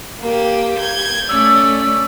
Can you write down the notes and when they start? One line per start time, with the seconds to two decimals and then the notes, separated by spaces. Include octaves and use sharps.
0.20 A#3 G4
0.79 G6 G#6
1.29 A3 C#4 D5 E6